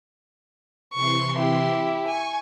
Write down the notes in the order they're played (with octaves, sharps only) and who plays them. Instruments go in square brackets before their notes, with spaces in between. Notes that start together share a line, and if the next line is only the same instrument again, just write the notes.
[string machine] C3 E3 C6 [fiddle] C#6
[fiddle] E4 G4
[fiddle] G#5 [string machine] C#6